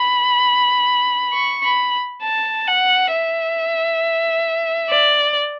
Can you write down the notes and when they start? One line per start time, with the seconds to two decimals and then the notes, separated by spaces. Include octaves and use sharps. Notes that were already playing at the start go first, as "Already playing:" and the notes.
Already playing: B5
1.34 C#6
1.63 B5
2.23 A5
2.68 F#5
3.12 E5
4.89 D5